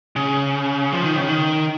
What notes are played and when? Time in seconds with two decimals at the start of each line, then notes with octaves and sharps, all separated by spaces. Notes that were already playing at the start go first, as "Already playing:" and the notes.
0.16 C#3
0.92 F3
1.04 D#3
1.16 C#3
1.28 D#3